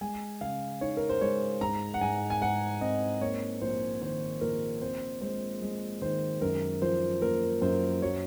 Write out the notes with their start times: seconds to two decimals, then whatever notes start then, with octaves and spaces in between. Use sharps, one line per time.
0.01 G#3 G#5
0.41 C#3 F5
0.81 D#4 C#5
0.97 A#4
1.09 C5
1.21 G#3 C#5
1.61 G#2 A#5
1.94 F#5
2.01 G#2 G#5
2.30 G#5
2.42 G#2 F#5
2.81 C4 D#5
3.21 A#3 C#5
3.61 A#1 C5
4.01 D#3 C5
4.41 A#1 A#4
4.81 C4 C5
5.21 G#3 C5
5.62 G#3
6.02 D#3 C5
6.42 F#2 A#4
6.82 F3 C5
7.21 A#3 A#4
7.62 F#2 C5
8.02 F#3 C#5